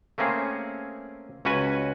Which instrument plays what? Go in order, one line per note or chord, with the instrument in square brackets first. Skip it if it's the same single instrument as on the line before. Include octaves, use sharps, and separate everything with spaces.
[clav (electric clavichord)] A3 A#3 C4 C#4 G#4
C#2 C#4 F#4 B4 G#5